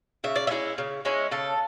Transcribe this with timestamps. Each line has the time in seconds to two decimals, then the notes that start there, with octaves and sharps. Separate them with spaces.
0.24 C#3 E5
0.36 D5
0.47 E5
0.50 G#3 C#4 E4
0.78 C#3
1.05 G#3 C#4 E4
1.31 C#3 A4